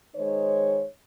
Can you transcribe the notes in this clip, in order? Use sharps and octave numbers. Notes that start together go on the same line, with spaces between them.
D#3 G#3 D#4 C5 C#5